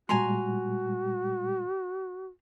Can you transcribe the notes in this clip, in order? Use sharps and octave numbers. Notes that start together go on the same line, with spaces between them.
A#2 G3 G#3 F#4 G#5 A#5 C6